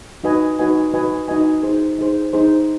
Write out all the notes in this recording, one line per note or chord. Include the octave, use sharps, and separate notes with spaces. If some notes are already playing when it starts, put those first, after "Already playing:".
D#4 F#4 B4 D#5 G#5
D#4 F#4 B4 D#5 G#5
D#4 F#4 B4 D#5 G#5
D#4 F#4 B4 D#5 G#5
D#4 G#4 C5
D#4 G#4 C5
D#4 G#4 C5